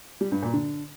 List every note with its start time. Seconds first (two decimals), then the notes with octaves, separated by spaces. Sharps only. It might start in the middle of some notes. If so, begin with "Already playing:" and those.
0.21 G3
0.32 G2
0.43 A#2
0.54 D3